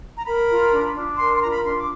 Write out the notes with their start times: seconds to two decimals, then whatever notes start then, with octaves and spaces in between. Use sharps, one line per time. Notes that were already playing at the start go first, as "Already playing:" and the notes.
0.17 A#5
0.26 A#4 B5
0.49 F4
0.72 D4
0.95 D4
1.18 A#4 C6
1.34 C6
1.42 F4 A#5
1.50 B5
1.65 D4 C6
1.78 D6